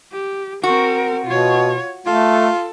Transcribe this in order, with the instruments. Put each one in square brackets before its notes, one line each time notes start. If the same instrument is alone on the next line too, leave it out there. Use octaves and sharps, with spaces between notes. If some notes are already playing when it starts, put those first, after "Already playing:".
[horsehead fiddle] G4
[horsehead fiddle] C4 A#4 [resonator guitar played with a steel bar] F#4
[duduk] B2 [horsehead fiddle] F4 C#5
[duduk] A3 [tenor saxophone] F4 [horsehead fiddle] A4